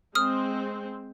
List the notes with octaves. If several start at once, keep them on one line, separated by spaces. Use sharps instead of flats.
G#3 C4 D#6 F6